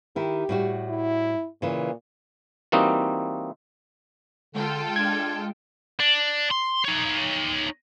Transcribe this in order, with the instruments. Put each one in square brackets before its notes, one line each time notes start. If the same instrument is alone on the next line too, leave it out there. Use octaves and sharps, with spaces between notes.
[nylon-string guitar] D#3 E4 [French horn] G4
[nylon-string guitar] A2 G3 F#4
[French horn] E4
[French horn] A#2 [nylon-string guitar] C#3 E3
[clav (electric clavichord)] E3 G3 A#3 C4 D#4 F#4
[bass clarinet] D3 [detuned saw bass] G#3 [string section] F4 A4 G5
[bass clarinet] D4 [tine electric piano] G#6
[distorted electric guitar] D4
C6
D#4 C#5